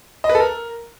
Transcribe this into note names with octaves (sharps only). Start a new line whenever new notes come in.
D#5
B4
A4
A#4